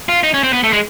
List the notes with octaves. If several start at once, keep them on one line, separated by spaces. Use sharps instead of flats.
F4
D#4
C#4
C4
B3
A3
G#3